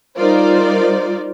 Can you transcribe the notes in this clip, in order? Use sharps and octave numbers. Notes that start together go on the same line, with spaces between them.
G3 D#4 F4 A#4 C5 D5